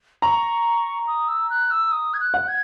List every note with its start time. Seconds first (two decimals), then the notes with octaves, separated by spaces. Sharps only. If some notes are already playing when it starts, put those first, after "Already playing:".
0.22 A#5 C#6
1.07 D#6
1.28 E6
1.50 F#6
1.71 E6
1.92 D#6
2.14 G#6
2.20 F#6
2.34 F#5
2.48 G#6